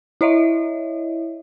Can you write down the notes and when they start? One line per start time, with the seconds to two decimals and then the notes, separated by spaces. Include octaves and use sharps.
0.21 E4 C#5 D#5 E5